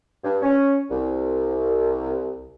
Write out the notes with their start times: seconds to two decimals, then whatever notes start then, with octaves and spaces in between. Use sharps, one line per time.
0.23 G2
0.42 C#4
0.89 C2